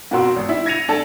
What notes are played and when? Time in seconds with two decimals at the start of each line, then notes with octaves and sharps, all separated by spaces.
0.11 F2 B2 F#4 A#4 C6 E6
0.36 G#1
0.49 E4
0.66 G#6 A#6 C#7 D#7 F7
0.88 D4 A4 A5